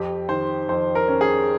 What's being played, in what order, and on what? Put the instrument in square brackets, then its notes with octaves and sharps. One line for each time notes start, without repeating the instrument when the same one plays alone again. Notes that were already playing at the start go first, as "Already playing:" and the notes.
Already playing: [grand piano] F2 G4
D#3 C5
F2 C5
A#4
C#4
G#4